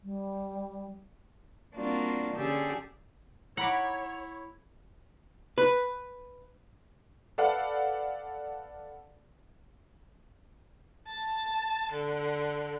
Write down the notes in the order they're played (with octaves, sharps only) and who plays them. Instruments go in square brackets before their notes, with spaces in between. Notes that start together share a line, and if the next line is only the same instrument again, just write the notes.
[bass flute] G3
[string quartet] G3 A#3 C4 D4 F4 F#4
D3 C#4 G4 G#4 D5 E6
[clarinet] E4 [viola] C#5 [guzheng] F#5 [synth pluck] A#5 B5 D6
[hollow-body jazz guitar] B4
[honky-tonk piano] A4 B4 D5 F5 F#5
[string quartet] A5
D3